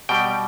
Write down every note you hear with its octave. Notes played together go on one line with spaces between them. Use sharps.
B2 G3 G5